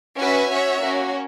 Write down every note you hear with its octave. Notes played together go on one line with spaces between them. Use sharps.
C#4 F#4 B4 E5 G#5
C#4 F#4 C#5 E5
A#3 C#4 F#4